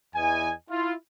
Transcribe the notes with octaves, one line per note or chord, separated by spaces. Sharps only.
E2 E3 D#5 G#5
E4 F4